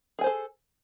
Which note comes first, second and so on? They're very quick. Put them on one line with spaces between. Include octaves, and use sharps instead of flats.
G#4 G#5 C5 A4